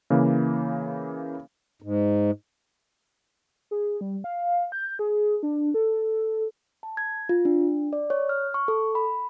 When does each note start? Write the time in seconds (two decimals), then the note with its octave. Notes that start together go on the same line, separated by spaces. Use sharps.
0.10 C#3 E3 A#3
1.82 G#2
3.71 G#4
4.01 G3
4.24 F5
4.72 G6
4.99 G#4
5.43 D4
5.74 A4
6.83 A5
6.97 G#6
7.29 F4
7.45 D4
7.93 D5
8.10 C#5
8.29 F6
8.54 C#6
8.68 A4
8.95 B5